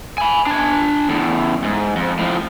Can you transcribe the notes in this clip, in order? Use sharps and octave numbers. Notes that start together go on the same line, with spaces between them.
G#5 B5
D4 G#5
E2 A2
G#2
F2
A2 F3